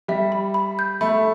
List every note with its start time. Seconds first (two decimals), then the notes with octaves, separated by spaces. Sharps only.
0.08 G3 E5
0.32 B5
0.54 B5
0.79 G6
1.01 A3 B5